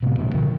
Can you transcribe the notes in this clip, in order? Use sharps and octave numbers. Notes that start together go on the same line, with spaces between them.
A2 C3
A#2 D3
D3 F3